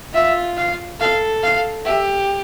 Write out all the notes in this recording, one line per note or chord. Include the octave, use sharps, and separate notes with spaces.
F4 E5
F5
A4 F5
F5
G4 E5